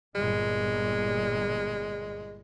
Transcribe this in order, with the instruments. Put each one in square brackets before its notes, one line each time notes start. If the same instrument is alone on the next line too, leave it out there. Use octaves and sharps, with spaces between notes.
[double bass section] G1 A#2 G3 [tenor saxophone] G#3